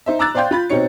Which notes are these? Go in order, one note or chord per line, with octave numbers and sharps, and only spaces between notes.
D#4 C5 E5
A#5 D6 E6 F#6 A6
C5 D5 F5 G5 C6 G6
F4 B5 A6
B2 C4 D#4 C#5 C#7